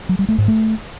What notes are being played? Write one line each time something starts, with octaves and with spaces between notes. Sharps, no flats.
F#3
G3
A3
G#2
A3